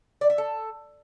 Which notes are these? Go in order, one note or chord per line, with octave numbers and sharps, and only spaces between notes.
D5
E5
A4